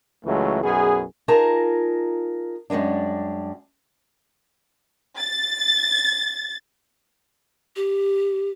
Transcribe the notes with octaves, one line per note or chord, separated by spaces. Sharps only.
C#2 E3 F#3 G#3 A3
B1 F#2 B3 G#4
D#4 F4 G#4 A#4 A5 A#5
F#2 G3 G#3 A#3 D4
A6
G4